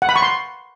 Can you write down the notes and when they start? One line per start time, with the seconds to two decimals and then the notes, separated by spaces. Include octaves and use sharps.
0.02 F#5
0.09 B5
0.16 C#6
0.22 C6